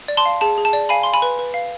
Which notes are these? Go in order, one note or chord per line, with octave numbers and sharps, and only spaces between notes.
D5
A5 C6
F5
G#4 A5
G#4
A5
D5
F5 G#5 B5
F5 C6
G#5 B5
B4
B4
F5